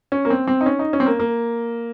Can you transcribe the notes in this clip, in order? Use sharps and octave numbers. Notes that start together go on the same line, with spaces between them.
C#4
A#3
C4
C4
D#4
C#4
D#4
C#4
C4
A#3
A#3